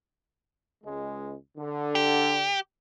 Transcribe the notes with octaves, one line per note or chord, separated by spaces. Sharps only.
C#2 G#3
D3
G4